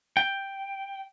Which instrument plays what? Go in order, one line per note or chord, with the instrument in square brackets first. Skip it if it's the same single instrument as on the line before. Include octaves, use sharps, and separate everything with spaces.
[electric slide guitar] G5